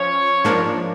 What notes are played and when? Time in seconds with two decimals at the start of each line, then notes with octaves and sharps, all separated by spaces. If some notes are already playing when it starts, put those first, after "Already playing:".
Already playing: F3 C#4 C#5
0.44 G#2 F3 A#3 D4